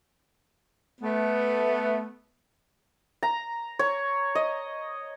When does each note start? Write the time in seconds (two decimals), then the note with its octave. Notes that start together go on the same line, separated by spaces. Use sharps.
1.01 A3 B3
3.23 A#5
3.79 C#5
4.35 D#5